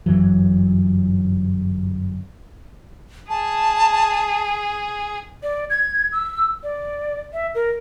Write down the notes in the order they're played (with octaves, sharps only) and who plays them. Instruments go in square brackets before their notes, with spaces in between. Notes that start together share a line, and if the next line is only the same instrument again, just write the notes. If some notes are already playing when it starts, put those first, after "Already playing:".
[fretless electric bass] G1 F#2 E3 F#3
[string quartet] G#4 [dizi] A5
[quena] D5
G#6
E6
D5
E5
A#4